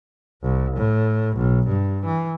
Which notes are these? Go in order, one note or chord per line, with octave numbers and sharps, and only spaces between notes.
C2
A2
B1
G2
E3